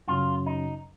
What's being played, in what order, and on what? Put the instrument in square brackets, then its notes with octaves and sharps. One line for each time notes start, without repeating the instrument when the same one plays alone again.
[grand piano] F#2 C#3 F#3 [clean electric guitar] F4
[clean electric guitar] D#4